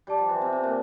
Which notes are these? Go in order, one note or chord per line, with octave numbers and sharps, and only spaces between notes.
G3 G4 D5 A5 D6
F3
E3
C3
C3
A#2